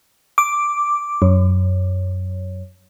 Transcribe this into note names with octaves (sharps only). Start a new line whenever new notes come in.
D6
F#2